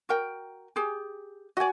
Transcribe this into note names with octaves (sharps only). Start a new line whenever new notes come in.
F#4 A#4 G5
G4 G#4
F#4 D5 D#5 G#5